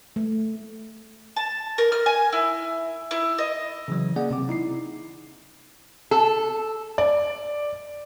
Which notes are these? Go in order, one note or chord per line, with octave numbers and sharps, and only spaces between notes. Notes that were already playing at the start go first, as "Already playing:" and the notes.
A3
A5
A#4
F6
G#5
E4
E4
D#5
C#3 E3 F#3
A#3 C#4 G#4 D5 F#5
C3 C4 D6
D#4 E4 C7
A4
D5